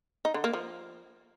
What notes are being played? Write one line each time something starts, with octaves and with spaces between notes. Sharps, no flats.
D#4
D3
A#3
F3